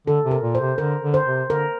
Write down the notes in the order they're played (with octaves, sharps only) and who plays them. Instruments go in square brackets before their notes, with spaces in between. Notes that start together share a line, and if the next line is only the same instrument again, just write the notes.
[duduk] D3 [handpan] A4
[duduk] C3
[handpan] A#4
[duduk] A#2
[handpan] C5
[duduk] C3
[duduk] D3 [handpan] A#4
[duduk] D3
[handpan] C5
[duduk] C3
[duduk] D3 [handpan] A#4